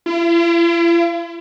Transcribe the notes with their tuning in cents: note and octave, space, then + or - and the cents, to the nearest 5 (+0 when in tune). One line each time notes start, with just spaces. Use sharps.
E4 +45